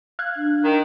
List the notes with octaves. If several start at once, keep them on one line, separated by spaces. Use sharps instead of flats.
F5 F#6 G#6
D4
D#3